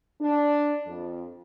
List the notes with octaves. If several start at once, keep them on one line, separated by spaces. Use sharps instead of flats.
D4
F2